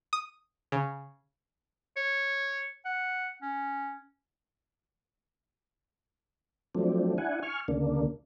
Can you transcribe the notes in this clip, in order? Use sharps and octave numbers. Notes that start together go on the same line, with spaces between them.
D#6
C#3
C#5
F#5
C#4
F3 F#3 A3 C4 D4
D4 E4 F#5 G#5
G#5 C#6 F6
D2 C#3 A#3 D4